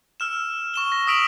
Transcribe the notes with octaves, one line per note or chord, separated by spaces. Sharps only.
E6 F6 E7
C#6 E7 G7
A#6
D#6 E6 B6 D7 F7 F#7